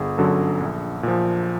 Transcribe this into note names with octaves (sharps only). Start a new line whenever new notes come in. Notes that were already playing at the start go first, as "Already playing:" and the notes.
Already playing: G1 G#4
F#2 D3 F#3 A4
A#1
A#2 F3